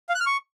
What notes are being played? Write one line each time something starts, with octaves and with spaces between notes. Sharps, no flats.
F5
F#6
F6
C#6